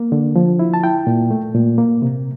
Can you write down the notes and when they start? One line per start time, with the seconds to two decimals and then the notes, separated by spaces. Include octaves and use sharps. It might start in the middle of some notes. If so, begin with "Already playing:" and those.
Already playing: A#3
0.12 D3
0.36 F3
0.59 E4
0.74 A5
0.83 E4 G5
1.07 A#2
1.31 A3
1.55 A#2
1.78 A#3
2.02 C3